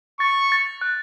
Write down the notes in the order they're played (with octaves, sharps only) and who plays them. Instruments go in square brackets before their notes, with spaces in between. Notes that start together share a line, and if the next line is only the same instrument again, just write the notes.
[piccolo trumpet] C#6 [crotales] A6
[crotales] A6
F#6